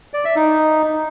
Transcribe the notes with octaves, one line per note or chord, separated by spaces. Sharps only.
D5
E5
D#4